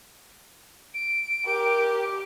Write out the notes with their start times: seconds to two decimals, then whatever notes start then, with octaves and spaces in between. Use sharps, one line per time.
0.94 D7
1.46 G4 A#4